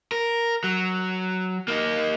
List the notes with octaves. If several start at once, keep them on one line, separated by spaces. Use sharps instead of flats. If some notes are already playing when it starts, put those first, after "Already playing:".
A#4
F#3
A#3 D#4